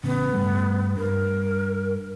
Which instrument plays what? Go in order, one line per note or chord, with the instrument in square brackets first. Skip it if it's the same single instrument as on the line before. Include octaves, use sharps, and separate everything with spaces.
[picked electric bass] A1 C#3 [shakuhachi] B3
[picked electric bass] G2 G3 A3
[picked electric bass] G2 [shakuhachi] A#4